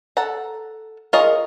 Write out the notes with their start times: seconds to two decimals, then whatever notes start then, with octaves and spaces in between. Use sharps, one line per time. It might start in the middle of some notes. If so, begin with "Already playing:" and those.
0.17 A4 F#5 A#5
1.13 F4 G#4 A#4 C#5 D#5